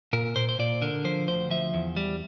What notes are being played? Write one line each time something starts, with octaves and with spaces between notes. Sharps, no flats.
A#2 A#4
A#2 C5
C5
A#2 D5
D3 A#4
F3 C5
D2 C5
F3 E5
E2
G3